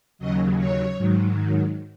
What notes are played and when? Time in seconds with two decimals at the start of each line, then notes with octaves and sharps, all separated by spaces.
0.19 D#2 C#3 F#3 D#5
0.58 C#5
0.97 G#2 D#3 F#3